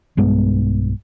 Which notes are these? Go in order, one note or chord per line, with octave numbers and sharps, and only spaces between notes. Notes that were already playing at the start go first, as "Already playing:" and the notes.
B1 G2 G#3 B3